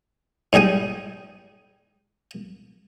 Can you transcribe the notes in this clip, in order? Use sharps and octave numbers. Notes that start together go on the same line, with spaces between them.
G#2 G3 G#4 G5 G#5